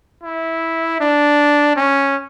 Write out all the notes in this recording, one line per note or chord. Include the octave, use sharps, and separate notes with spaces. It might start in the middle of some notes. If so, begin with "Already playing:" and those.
E4
D4
C#4